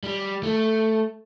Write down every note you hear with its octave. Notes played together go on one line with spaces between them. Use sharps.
G3
A3